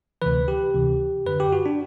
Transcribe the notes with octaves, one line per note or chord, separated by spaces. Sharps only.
D2 C3 E3 B4
G4
D2 C3 E3
F#2 D3 B4
G4
F#4
D4